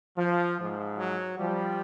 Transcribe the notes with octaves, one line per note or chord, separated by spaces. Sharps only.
F3
G#2 F3
F#3
F3 G3